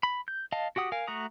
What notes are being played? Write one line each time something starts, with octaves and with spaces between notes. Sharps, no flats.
B5
G6
D#5 F5 A5
F#4 G4 F#5 D#6
A#4 F5 G#5
A3 F#4 A#5 D#6